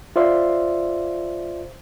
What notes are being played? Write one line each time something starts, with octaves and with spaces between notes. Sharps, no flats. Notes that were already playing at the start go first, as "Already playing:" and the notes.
F4 C5 D5 E5 F5 C6